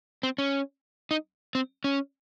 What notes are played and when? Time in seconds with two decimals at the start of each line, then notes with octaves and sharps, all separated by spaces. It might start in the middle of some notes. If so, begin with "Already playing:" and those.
0.23 C4
0.38 C#4
1.11 D#4
1.55 C4
1.84 C#4